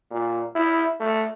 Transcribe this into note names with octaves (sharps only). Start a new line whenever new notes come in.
A#2
E4
A3